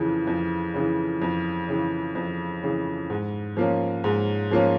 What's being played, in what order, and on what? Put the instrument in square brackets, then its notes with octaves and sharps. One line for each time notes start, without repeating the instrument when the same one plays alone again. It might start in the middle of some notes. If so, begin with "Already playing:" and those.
Already playing: [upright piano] F2 C#3 E3
F2
C#3 E3
F2
C#3 E3
F2
C#3 E3
G#2
F3 A#3 C#4
G#2
F3 A#3 C#4